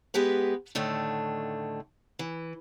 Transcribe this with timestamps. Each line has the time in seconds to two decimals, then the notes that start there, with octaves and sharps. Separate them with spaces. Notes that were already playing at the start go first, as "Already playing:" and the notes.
0.14 G#3 B3 G4 B4
0.75 A2 D3 D#3 A3 D4
2.19 E3